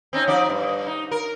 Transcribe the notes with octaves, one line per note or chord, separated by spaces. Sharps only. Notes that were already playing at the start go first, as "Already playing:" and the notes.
C4 C#4 D#4
F3 D#4 D5
G2
D#4
A#4